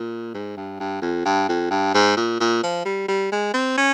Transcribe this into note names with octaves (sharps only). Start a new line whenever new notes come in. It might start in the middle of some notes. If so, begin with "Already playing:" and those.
Already playing: A#2
G#2
G2
G2
F2
G2
F2
G2
G#2
A#2
A#2
F3
G3
G3
G#3
C4
C#4